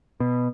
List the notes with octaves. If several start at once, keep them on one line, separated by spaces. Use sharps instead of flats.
B2